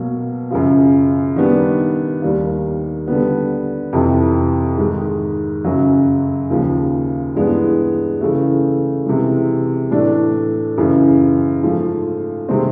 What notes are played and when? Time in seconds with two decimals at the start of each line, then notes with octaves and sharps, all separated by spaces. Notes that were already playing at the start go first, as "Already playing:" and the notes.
Already playing: B2 F#3 A#3
0.50 F#2 C#3 F3
1.36 D#3 G3 B3 D4
2.22 D#2 D#3 G3 A#3
3.07 D3 G3 B3
3.93 F2 C3 E3
4.78 G#2 D#3 G#3
5.64 F#2 C#3 F#3
6.50 D#2 C#3 F3
7.35 G2 E3 G#3 B3
8.21 C#3 E3 A3
9.06 C3 E3 G#3
9.91 A2 E3 A3 D4
10.78 F#2 C#3 E3
11.63 G#2 F3 A3
12.49 C3 D#3 G#3 C4